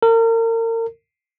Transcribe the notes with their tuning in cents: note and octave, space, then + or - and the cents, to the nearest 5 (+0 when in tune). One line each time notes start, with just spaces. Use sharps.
A#4 -35